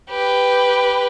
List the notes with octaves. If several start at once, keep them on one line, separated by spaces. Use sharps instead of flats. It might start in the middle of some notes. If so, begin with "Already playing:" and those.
G4 B4